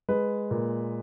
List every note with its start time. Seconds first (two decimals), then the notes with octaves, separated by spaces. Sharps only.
0.09 G#3 B4
0.51 A#2